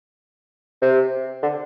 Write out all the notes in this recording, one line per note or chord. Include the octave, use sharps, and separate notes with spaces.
C3
D3